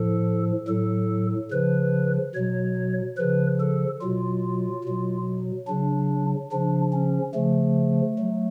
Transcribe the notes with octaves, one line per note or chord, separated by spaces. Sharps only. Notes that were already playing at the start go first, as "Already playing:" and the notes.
Already playing: A2 F3 A4
A2 F#3 A4
C#3 F3 B4
B2 F#3 C#5
C#3 F3 B4
A4
B2 F#3 F4
B2 F#3
C#3 F#3 D4
C#3 F3 D4
C#4
C#3 F3 A3
F#3